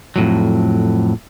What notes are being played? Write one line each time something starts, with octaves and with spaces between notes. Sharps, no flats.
F2 A2 F#3